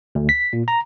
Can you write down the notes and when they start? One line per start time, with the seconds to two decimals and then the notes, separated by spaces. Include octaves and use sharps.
0.15 D2
0.29 B6
0.53 A#2
0.68 A#5